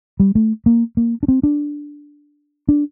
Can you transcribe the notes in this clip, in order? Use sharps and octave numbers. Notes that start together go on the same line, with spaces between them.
G3
A3
A#3
A#3
D4
C4
D4
D4